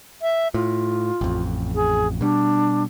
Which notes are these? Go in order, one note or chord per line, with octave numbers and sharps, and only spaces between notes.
E5
A2 F4
A1 F2
G#4
B2 G3 D4